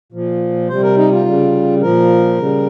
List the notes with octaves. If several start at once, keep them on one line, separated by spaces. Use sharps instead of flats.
A#2 F3
C3 G3 C5
A#4
D#4
F4
C#3 G3
A#2 F3 A#4
C#3 G3